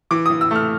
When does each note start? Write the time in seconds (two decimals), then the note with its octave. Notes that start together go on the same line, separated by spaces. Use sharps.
0.11 E3 D6
0.26 E3 D#6
0.41 E6
0.51 A3 F6